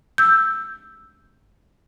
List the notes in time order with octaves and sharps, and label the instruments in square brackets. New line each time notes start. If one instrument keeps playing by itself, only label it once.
[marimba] E6 G6